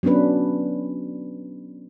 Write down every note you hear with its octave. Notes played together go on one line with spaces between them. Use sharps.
F#3 B3 C#4 D4 B4